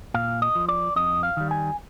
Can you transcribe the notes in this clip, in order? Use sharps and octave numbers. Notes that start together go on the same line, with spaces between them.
A#2 F5
D#5
F3
D5
F2 D#5
F5
D#3 G3
G#5